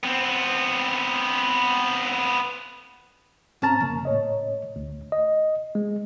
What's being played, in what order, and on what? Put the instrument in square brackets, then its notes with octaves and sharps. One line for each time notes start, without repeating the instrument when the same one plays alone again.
[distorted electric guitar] B3 C4
[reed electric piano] G#2 C4 A6 [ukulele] C#4 A5 A#5
[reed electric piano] F2 C#3 A#3 [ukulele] C#4
[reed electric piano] A2 C#5 D#5
[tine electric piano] D2
D#5
G#3